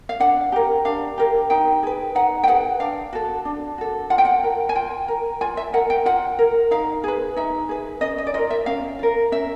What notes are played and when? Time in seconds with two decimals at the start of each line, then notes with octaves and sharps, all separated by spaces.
0.09 F5
0.20 D4 F#5
0.52 G4 A#4
0.85 D4 F5
1.18 G4 A#4
1.50 D#4 G5
1.83 G#4 B4
2.15 D#4 F#5
2.43 G5
2.48 G#4 B4 F#5
2.80 D4 F5
3.13 F#4 A4
3.45 D4
3.78 F#4 A4
4.10 F4 F#5
4.18 G5
4.25 F#5
4.43 A#4
4.69 G#5
4.75 F4 G5
5.08 A#4
5.41 F4 G#5
5.57 E5
5.73 A#4 F#5
5.90 G5
6.06 F4 F#5
6.39 A#4
6.71 D#4 F5
7.04 G#4 B4
7.36 D#4 E5
7.69 G#4 B4
8.01 C#4 D#5
8.18 D#5
8.27 D5
8.34 F4 A#4 D#5
8.50 E5
8.66 C#4 F5
8.99 F4 A#4
9.32 C#4 E5